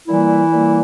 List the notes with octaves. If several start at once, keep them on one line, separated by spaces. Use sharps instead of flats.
A#2 E3 G3 A#3 E4
A#2 G3 A#3